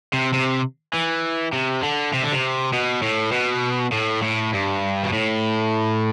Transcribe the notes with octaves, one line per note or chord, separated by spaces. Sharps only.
C3
C3
E3
C3
D3
C3
D3
C3
B2
A2
B2
A2
A2
G2
B2
A2